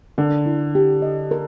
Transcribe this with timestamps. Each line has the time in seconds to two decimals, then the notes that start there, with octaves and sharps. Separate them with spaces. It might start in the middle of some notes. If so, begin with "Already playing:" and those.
0.18 D3 A#4
0.46 E4
0.75 G4
1.02 D#5
1.31 A#4